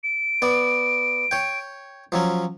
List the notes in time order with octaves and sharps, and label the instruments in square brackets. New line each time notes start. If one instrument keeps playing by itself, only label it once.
[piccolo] D7
[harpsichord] B3 D5
C#5 G5
F3 F#3 C#4